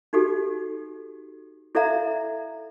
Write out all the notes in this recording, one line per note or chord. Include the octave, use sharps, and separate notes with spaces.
D#4 F#4 G4 A4
E4 A4 D5 E5 F5 A#5